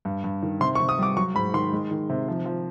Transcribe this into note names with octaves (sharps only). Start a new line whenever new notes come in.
G2
G2
D#3
C3 C6
C#6
C3
D#6
G3 D6
F#3 C#6
G#2 B5
D#3 C6
G#3
D#3
C3
F3
F3